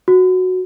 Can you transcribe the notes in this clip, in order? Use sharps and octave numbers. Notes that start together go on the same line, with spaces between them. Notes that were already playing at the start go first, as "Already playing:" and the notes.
F#4